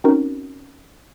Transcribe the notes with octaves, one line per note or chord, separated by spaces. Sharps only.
C4 C#4 D#4 F#4 A#4